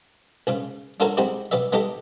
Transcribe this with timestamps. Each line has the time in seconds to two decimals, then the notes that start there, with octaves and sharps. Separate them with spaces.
0.47 C#2 G#2 C#3
1.00 D4 F4 F#4 A4 A#4 C#5
1.17 G#3 C4 D#4 E4 F#4 G4
1.51 B2 B3 D5 E5
1.72 B3 D#4 E4 G4 A4 D#5